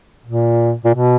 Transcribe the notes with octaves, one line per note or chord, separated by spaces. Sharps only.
A#2
A#2
B2